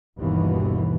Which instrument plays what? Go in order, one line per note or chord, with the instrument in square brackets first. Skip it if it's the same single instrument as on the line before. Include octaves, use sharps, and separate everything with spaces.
[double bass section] G1 D#2 B2 E3